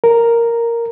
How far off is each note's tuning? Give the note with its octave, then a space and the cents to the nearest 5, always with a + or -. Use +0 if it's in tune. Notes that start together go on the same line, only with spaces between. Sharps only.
A#4 +0